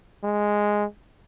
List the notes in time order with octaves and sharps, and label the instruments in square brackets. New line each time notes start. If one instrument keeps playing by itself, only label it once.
[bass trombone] G#3